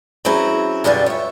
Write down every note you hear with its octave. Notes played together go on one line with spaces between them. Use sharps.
F#3 C4 C#4 E4 G#4
F#2 B2 D3 G3 F4 G#5
C#5 E5